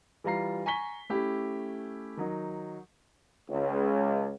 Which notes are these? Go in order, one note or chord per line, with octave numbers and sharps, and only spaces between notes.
E3 G3 F4 A#5 C7
G#5 A#5 C#6 B6 G7
A3 C#4 E4 G4
D#3 F#3 D#4
C#2